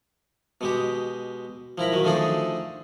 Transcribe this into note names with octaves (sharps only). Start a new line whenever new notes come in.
B2 G#3 G4
F3 E4 A#4 B5
D#3 F#3
D3 F3 A3 D4 D#4 G#4